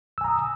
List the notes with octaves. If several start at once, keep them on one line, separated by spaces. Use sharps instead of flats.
G#5 A#5 D#6 E6